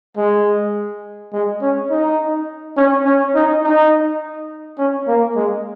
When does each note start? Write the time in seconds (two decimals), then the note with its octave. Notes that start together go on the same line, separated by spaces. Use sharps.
0.17 G#3
1.33 G#3
1.62 C#4
1.91 D#4
2.77 C#4
3.05 C#4
3.35 D#4
3.64 D#4
4.78 C#4
5.08 A#3
5.36 G#3